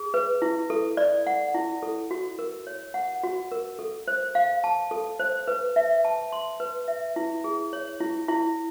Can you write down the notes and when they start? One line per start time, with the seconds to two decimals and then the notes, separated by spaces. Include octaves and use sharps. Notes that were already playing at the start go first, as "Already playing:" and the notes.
Already playing: G#4
0.14 B4
0.42 E4
0.70 A4
0.97 D5
1.27 F#5
1.55 E4
1.83 A4
2.11 F#4
2.39 A#4
2.67 C#5
2.94 F#5
3.23 F#4
3.52 A#4
3.79 A4
4.08 C5
4.35 F5
4.64 A5
4.91 A4
5.20 C5
5.48 B4
5.76 E5
6.05 A5
6.32 C6
6.60 B4
6.88 E5
7.16 E4
7.44 G#4
7.73 C#5
8.01 E4
8.28 E4